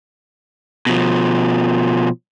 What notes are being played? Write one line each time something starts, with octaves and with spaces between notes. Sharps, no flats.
B2 F3